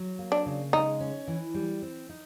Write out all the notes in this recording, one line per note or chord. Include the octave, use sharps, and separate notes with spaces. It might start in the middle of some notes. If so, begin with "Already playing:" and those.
Already playing: F#3
A#3
D4
C#3
G#3 D#4
C#4
E3
G3
C4
D#4